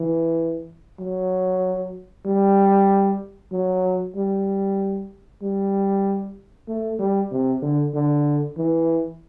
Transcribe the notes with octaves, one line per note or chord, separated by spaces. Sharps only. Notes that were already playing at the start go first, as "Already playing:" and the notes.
Already playing: E3
F#3
G3
F#3
G3
G3
A3
G3
C3
D3
D3
E3